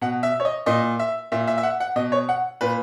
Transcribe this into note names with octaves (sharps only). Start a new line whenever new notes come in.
B2 F#5
E5
C#5
D#5
A#2 D#5
E5
A#2 E5
E5
E5
F#5
F#5
B2 D#5
C#5
F#5
A#2 B4